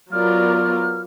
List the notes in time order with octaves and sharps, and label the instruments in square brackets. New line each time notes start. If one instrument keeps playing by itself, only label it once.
[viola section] F#3 B3 F4 A#4 D5 [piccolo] F6